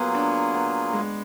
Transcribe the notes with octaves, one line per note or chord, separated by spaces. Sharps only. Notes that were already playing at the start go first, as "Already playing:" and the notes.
Already playing: F#3 A#3 B3 F4 G#4
D4
B3
G#3